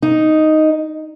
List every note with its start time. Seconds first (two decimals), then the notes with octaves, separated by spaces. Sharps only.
0.02 D#4